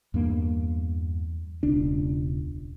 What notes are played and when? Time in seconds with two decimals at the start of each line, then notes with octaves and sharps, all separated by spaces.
0.14 E2 G2 A#3
1.63 E1 C#2 D4